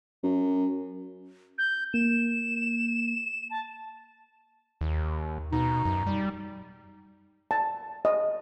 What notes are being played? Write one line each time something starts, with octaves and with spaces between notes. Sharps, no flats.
F#2
G6
A#3 E7
A5
D#2
B2 D#4
F#2
G3
A5
D#5